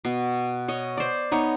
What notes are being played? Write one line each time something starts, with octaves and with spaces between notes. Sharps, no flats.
B2
C#5 D#5
C5 D5
B3 D#4 C#5